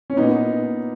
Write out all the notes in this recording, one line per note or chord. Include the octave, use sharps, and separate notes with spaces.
C#4
A#2 B3 D#4